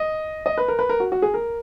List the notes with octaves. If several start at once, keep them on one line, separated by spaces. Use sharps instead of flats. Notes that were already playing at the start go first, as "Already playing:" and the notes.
Already playing: D#5
D#5
B4
A#4
B4
A#4
F#4
F#4
G#4
A#4